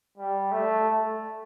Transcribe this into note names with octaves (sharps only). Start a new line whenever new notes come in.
G3
A3